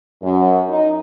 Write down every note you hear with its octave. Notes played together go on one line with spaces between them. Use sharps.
F#2
D#4